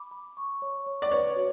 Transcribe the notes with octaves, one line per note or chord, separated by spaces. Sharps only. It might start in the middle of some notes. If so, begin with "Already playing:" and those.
Already playing: B5 D6
B5
C#6
C#5
C#5
D5
B4 C#5
F#4